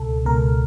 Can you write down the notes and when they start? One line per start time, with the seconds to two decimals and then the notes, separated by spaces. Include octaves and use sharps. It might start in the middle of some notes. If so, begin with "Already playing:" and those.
Already playing: C#2 B2 A4
0.25 C#2 B2 A#4